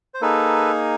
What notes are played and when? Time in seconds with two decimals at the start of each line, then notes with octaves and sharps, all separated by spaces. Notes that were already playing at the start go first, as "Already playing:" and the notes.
0.14 C5
0.21 A#3 D#4 G#4 A4 B4